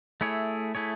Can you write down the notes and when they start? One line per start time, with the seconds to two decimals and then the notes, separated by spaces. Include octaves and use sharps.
0.21 A3 E4 G#4 C#5
0.75 A3 E4 G#4 C#5